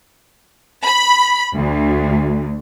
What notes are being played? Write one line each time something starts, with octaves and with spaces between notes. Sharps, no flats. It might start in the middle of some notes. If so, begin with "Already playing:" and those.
B5
D2